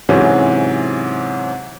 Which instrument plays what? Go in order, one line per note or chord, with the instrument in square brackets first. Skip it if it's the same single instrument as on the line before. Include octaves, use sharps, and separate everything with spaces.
[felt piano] G#2 C3 E3 F#3 C#4